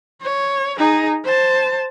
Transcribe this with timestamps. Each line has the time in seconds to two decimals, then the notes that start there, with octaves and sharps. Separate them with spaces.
0.22 C#5
0.78 D#4 G#4
1.25 C5 A5